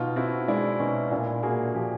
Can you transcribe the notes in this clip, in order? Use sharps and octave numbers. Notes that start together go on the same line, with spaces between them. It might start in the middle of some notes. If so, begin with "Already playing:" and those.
Already playing: B2 D#4 F4
C4 E4 F#4
G#3 D4 E4
B2 C#4 D#4
A#2 D4 E4
A#3 F#4 G#4
F3 G4